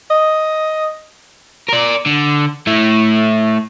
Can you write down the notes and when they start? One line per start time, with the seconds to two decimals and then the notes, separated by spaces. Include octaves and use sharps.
0.10 D#5
1.69 A#4 D5
2.07 D3
2.67 A3 E4